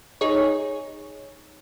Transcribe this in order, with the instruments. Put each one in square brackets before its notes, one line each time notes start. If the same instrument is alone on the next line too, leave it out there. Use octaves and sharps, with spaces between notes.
[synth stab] D#4 G#4 C#5